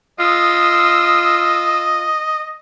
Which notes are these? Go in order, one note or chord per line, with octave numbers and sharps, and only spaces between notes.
F4 D#5 D#6 E6